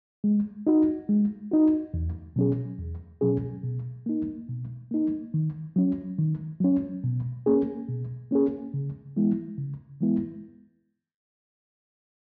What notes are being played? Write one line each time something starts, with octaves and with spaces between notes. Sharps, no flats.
G#3
D#4 F#4
G#3
D#4 F#4
E2
B2 F#3 C#4 G#4
E2
B2 F#3 C#4 G#4
B2
A#3 D#4
B2
A#3 D#4
D#3
F#3 C#4
D#3
F#3 C#4
B2
A#3 C#4 G#4
B2
A#3 C#4 G#4
C#3
E3 G#3 B3 E4
C#3
E3 G#3 B3 E4